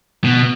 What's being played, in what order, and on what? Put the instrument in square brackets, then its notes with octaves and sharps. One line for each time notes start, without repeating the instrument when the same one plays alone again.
[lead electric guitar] B2